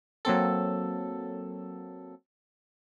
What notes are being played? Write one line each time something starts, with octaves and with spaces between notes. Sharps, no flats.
F#3 A#3 C4 A4